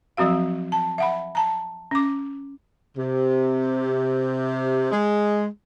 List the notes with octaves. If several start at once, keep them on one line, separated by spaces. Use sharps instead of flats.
F3 F#3 C4 F#4 F5
A5
E5 F#5 B5
A5 A#5
C#4 D6
C3
G#3